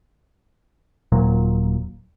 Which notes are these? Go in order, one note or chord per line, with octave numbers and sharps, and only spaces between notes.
D#1 A#2 F#3